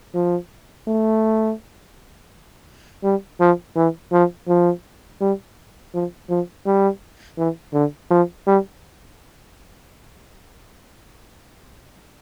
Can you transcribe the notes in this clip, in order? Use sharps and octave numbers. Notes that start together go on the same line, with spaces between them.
F3
A3
G3
F3
E3
F3
F3
G3
F3
F3
G3
E3
D3
F3
G3